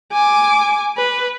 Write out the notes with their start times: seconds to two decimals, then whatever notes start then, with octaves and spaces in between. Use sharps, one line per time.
0.12 G#5 D6
0.97 B4